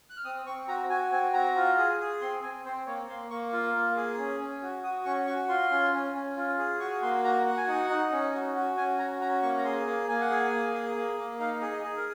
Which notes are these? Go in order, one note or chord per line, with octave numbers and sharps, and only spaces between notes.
F#6
F6
C4 D#6
C4 C#6
F#4 A#5
F#4 G#5
C4 G#5
F#4 A#5
F4
G#4
G#4
C4 C6
C4 G#5
C4 C5
A#3 C#5
A#3 C6
A#3 C#6
F4
A#3
G#4
C#4
C#4
F#4
F#4 D#6
C#4 C#6
F#4 C#6
F4 C6
C#4
C#4
C#4
F4
G#4
F#4 C#6
A#3 C6
F#4 A#5
F#4 F#5
G#5
D#4 F#5
D#4
C#4
F#4
F#4
C#4 G#5
F#4 A#5
C#4 A#5
A#3 C#6
A#5
G#4 C6
A#3
A#3 G#5
F#5
G#4 G#5
A#3
G#4
A#3
A#3
D#4 F5
G#4
D#5
G#4
A#4